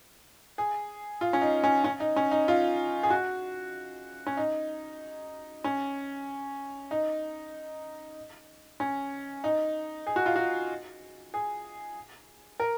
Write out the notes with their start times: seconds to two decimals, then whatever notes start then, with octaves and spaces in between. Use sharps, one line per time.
0.58 G#4
1.21 F4
1.33 C#4
1.42 D#4
1.64 C#4
1.84 C#4
2.00 D#4
2.16 C#4
2.31 D#4
2.48 F4
3.03 G#4
3.10 F#4
4.27 C#4
4.37 D#4
5.64 C#4
6.91 D#4
8.80 C#4
9.44 D#4
10.07 G#4
10.16 F#4
10.26 F4
10.36 F#4
11.34 G#4
12.60 A#4